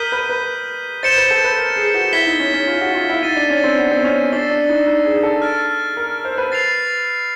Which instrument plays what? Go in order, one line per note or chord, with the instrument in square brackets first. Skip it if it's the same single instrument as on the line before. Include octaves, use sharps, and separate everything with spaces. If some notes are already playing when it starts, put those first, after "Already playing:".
Already playing: [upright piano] A#4 [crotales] D#6 G6 B6 D#7 G7
[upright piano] B4
B4
[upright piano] C5 [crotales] A6 C#7 E7 G7
[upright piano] B4
A4
B4
A#4
G#4
F#4
[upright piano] E4 [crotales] G#6 B6 E7 G7
[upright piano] D#4
C#4
C#4
F4
F#4
F4
E4
[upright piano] D#4 [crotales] A6 C7 D#7
[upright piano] D4
C#4
C4
B3
C4
C#4
[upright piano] D4 [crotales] C#6 E6 A6 C7 D#7
[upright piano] D4
D#4
D#4
G#4
A4
[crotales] F6 A6 D7
[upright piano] A#4
C5
B4
[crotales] A6 C7 F7